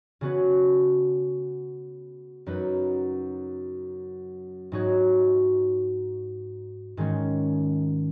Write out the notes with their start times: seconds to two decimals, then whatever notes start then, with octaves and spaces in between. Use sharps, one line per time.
0.21 C#3 B3 F#4 C#5
2.46 F#2 F#3 D#4 B4
4.72 G#2 F#3 D#4 F#4 C#5
6.97 G#2 D#3 G#3 C#4